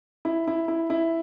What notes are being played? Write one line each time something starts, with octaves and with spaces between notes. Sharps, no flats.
E4
E4
E4
E4